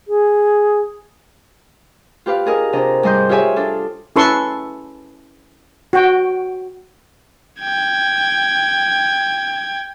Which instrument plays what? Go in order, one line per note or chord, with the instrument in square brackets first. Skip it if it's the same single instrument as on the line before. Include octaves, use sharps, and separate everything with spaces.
[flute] G#4
[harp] F4 G4 B4 F5
D4 G#4 A#4 D#5
C3 D4 D#5 A#5
G#2 G3 D#5 C6 G6
F4 G4 G#4 C#5 E5 G#5
D4 F4 A4
[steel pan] C#4 E4 A4 B4 C6 C#6
F#4 G5
[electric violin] G5 G#6